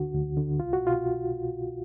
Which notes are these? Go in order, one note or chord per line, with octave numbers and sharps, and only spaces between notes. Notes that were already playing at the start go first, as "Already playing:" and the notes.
Already playing: D2 D3 F#4
D2
D3
C2 F4
F#4
B2 F4